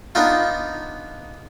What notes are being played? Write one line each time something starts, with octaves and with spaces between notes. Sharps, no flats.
B3 D4 D#4 F4